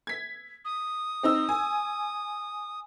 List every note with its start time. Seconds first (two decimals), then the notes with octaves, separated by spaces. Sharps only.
0.07 G#6 B6
0.65 D#6
1.23 C4 D#4 E6
1.49 G#5